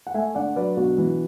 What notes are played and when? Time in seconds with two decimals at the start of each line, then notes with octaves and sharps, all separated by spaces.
0.07 F#5
0.14 A3 E5 G#5
0.35 D3 D5 F#5
0.56 F#3 B4 D5
0.77 B2 D4 F#4
0.98 E3